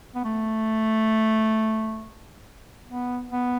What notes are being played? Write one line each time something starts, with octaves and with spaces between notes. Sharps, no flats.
B3
A3
B3
B3